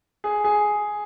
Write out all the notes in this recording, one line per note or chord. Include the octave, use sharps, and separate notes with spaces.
G#4
G#4